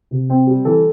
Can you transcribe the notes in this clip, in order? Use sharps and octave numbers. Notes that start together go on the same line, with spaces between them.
C3
C4
G3
E3 A4